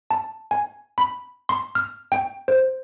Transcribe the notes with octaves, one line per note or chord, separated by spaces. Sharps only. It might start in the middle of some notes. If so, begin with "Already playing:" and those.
A5
G#5
B5
C6
F6
G5
C5